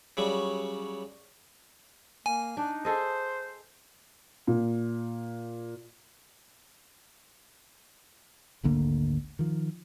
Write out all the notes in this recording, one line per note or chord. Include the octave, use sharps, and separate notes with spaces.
C#3 F#3 G3
A#3 G#5
D4 D#4
G#4 A4 C5 D#5
A#2
G#1 D2 D3 A#3
D#3 F3